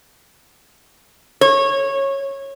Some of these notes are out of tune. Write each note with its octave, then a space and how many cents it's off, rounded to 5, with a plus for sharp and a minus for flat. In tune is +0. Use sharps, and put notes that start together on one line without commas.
C#5 -15